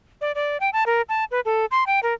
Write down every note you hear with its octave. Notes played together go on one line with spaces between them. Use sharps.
D5
D5
G5
A5
A#4
A5
B4
A4
C6
G5
A#4